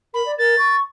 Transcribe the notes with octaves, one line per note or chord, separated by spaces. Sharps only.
A#4 B5
D5
A#4 A6
C#6